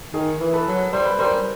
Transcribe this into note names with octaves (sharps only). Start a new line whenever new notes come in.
D#3 G#4 A#4
E3
A4 B4
F#3
G3 C5
B4
G3 A#4 C5